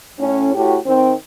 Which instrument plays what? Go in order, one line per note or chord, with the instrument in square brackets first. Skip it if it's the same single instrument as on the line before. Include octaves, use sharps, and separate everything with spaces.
[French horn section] A2 C#4
A2 F#4 G4
D#3 C4